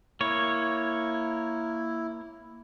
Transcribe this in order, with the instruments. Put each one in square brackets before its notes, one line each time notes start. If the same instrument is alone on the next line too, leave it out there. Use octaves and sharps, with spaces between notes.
[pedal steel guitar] A#3 C#5 [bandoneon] E4